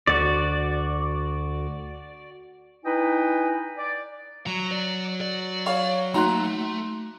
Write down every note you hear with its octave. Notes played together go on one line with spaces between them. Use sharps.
D2 F#4 D5
D#4 E4 B4 D#5 G5 G#5
D5
F#3 A#5
D5
D5
C#5 F5
A3 A#3 D#4 F#4 A#5 C6 F#6